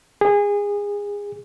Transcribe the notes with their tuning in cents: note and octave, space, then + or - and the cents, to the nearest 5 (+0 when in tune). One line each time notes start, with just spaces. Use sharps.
G#4 -25